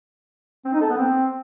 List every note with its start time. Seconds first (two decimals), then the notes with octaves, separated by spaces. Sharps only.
0.65 C4
0.73 D#4
0.81 A4
0.89 B3
0.98 C4